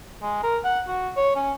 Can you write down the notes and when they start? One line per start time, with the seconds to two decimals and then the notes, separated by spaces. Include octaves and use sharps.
0.22 G#3
0.43 A#4
0.64 F#5
0.87 F#4
1.16 C#5
1.36 C#4